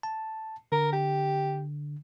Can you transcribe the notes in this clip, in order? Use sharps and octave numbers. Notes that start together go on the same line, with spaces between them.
A5
D3 A#4
G4